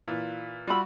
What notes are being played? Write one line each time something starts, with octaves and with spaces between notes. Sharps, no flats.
A#2 E3
G3 F4 F#4 B5 E6